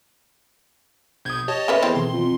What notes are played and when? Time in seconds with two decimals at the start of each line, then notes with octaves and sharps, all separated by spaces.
1.25 A#1 B2 D#6 G6 G#6
1.48 G4 C#5 D#5 A5
1.68 C#3 A3 A4 B4 B5
1.83 E2 C4
1.95 B2 D#3 E3 C6
2.13 F2